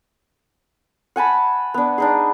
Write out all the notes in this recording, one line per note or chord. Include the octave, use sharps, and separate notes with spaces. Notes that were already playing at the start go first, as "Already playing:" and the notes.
F#5 G#5 A5 B5
B3 D4
D4 D#4 G#4